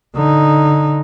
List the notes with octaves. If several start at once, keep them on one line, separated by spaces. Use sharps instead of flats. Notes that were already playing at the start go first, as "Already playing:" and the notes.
D3 D#4